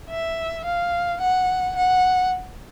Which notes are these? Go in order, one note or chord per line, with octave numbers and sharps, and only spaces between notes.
E5
F5
F#5
F#5